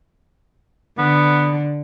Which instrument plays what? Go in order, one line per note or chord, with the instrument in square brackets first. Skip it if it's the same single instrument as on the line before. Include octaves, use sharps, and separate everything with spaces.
[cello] D3 [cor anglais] B3